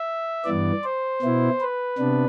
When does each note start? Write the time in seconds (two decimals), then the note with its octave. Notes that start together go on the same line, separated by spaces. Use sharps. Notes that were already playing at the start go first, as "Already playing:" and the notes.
Already playing: E5
0.45 G2 E3 B3 D5
0.84 C5
1.22 B2 B3 E4
1.60 B4
1.98 C3 B3 D4